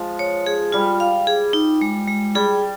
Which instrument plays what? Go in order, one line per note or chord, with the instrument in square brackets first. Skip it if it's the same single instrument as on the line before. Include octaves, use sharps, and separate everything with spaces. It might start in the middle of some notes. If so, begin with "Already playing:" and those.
Already playing: [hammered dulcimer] F3 G#3
[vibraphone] C#5
G#4
[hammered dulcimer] G3 [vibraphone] F4
[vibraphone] F5
G#4
D#4
G#3
G#3
[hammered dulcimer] G3 [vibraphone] G#4